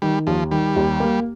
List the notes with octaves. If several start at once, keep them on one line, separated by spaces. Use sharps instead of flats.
D#3 G3
D#2 F3
D#3 G3
D#2
A#3